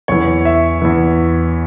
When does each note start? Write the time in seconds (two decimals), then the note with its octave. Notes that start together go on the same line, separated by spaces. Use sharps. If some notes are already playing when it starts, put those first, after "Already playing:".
0.08 E2 E3 C#5
0.45 E5
0.82 E2 E3